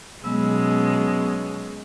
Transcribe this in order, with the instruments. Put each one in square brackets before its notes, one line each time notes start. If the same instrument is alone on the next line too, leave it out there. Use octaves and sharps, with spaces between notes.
[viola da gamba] B2 G#3 C#4 [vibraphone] F#3 B3 E6